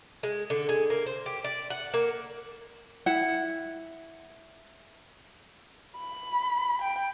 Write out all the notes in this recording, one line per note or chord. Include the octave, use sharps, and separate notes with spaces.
G#3
D3
G#3
A#3
C5
G4
D5
F#5
A#3
E4 F#5
B5
G5